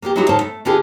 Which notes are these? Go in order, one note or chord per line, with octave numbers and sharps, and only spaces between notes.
A#3 B3 E4 G4
F#3 G#3 B3 E4 F#4 G4
F#2 A2 D#3 C#4 C5 A5
A3
D3 D4 F4 G4 G#4 B4